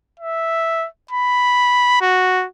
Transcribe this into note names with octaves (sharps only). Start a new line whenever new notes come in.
E5
B5
F#4